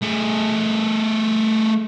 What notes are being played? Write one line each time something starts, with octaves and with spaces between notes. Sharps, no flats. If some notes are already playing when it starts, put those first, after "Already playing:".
A3 G#4